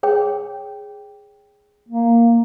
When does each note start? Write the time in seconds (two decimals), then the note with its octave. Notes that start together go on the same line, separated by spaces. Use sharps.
0.03 G#4 C#5 G5
1.89 A#3